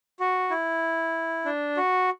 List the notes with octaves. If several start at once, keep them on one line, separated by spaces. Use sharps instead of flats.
F#4
E4
D4
F#4